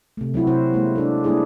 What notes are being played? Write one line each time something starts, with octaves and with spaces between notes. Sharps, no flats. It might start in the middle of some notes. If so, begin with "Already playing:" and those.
C3 A3
F#3 C4 E4 F#4
C3 E4 C5
G#3 A#3
D4 A4
G3 A#3 D4 E4 G#4